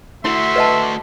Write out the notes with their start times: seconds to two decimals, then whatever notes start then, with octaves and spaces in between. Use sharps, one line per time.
0.25 A3 E4 F#4 E5 C6
0.56 B4 D#5 A5